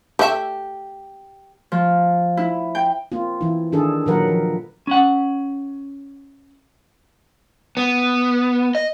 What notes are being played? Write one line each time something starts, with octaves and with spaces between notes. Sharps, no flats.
A3 G4 E5
F3
E4
G5
A#3 C4 F4
E3 E4
D#3 D4 G#4 A4
A#2 D#3 F#3 A#4 B4 F#5
F3
C#4 F#5
B3
D#5